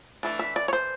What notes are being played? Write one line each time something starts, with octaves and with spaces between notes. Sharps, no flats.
E3 A3 D4
E5
D5
C#5
C5